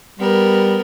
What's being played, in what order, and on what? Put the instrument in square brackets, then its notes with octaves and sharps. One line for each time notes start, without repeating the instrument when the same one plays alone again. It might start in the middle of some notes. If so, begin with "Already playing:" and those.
[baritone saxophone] G3 [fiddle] B3 A#4